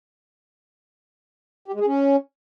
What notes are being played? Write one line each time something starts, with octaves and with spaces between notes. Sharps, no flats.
G4
G#3
G#4
C#4